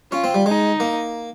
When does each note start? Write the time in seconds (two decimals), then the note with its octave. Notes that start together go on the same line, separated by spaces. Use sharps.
0.12 C#4 F4
0.24 C4
0.34 G3
0.46 G#3 D#4
0.80 A#3